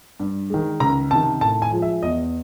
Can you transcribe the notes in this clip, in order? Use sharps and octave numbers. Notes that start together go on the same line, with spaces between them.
G2
D#3 G#3
C#2 A#5
C3 D#3 A5
A2 A5
G#5
F3 G#3
E5
E2 D#5